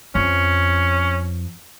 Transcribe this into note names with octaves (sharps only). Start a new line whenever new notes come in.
F2 C#4